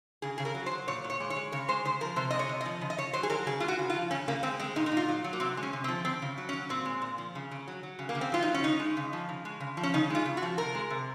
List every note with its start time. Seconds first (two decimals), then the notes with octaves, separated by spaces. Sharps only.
0.22 C#3 G#4
0.38 C#3 G#4
0.45 A#4
0.55 F#3
0.66 C5
0.72 F#3
0.88 A#2 C#5
1.04 A#2
1.10 C#5
1.20 G#3
1.30 C#5
1.36 G#3
1.52 C#3 C#5
1.68 G#3 C5
1.85 C#3 C5
2.01 F3 A#4
2.16 C3 C5
2.31 G#3 D#5
2.39 C#5
2.49 C3
2.61 D#5
2.65 F3
2.81 C#3
2.90 D#5
2.98 C#3 C#5
3.13 F#3 C5
3.23 G#4
3.30 F#3 A#4
3.46 C#3 G#4
3.60 G#3 F4
3.68 F#4
3.79 C#3
3.90 F4
3.95 F3
4.11 C#3 C#4
4.28 C#3 A#3
4.43 G#3 C4
4.59 G#3 C4
4.76 A#2 D#4
4.86 D#4
4.92 A#2
4.97 F4
5.08 F#3
5.24 F#3
5.33 A#3
5.40 C3 C4
5.57 G#3
5.63 C#4
5.73 C3
5.84 C4
5.88 F3
6.05 C#3 C4
6.22 C#3
6.38 F#3
6.49 C#4
6.53 F#3
6.69 A#2 C4
6.85 G#3
7.02 A#2
7.18 F3
7.35 C#3
7.51 C#3
7.68 F#3
7.83 F#3
7.99 C#3
8.09 A#3
8.15 C#3
8.21 C4
8.32 F#3 F4
8.42 D#4
8.48 F#3
8.54 C#4
8.63 C#3 D#4
8.80 G#3
8.97 C#3
9.13 F3
9.29 C#3
9.45 G#3
9.60 C#3
9.77 F3
9.83 C#4
9.94 C#3 D#4
10.10 G#3 F4
10.25 C#3
10.37 F#4
10.43 F3
10.58 C3 A#4
10.75 G#3
10.90 C3